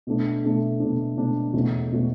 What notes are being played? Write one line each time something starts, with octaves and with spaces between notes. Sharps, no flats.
B2 A3 D4
B2 A3 D4
B2 A3 D4
B2 A3 D4
E2 B2 A3 C#4 F#4
B2 A3 C#4 F#4